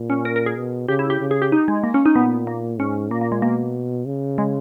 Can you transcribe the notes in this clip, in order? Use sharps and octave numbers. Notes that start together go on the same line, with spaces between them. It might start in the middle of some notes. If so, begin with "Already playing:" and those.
Already playing: A#2
C#4
A#4
A#4
G#4
B2
C#3 G4
E4
G4
C#3
G#4
G4
D#4
G#3
A#3
C#4
D#4
A#2 B3
A#3
G#2 C#4
A#2 A#3
A#3
G#3
B2 A#3
C#3
G#3